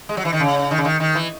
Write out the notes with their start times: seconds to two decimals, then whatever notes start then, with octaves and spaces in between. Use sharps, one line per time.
0.09 G#3
0.17 F#3
0.25 E3
0.33 D#3
0.40 C#3
0.71 D#3
0.78 C#3
0.85 D#3
1.00 D#3
1.15 E3